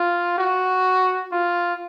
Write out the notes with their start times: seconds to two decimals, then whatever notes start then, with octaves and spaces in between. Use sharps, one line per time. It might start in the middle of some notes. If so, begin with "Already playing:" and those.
Already playing: F4
0.38 F#4
1.32 F4